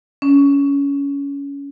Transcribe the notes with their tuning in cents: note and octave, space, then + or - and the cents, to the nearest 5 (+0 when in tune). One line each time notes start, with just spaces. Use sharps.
C#4 +20